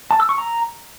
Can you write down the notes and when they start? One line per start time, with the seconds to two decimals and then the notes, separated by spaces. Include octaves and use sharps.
0.11 A5
0.20 E6
0.29 C#6
0.38 A#5